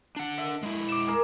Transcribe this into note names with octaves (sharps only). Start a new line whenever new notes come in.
D4 F#5
E5
G#3 E4
D6 E7
G#4 A#4